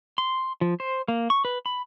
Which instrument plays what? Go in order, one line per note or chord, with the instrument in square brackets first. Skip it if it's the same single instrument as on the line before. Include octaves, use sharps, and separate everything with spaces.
[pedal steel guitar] C6
F3
C5
A#3
C#6
B4
B5